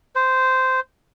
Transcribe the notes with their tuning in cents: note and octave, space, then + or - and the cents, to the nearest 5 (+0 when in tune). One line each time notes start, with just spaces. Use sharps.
C5 -10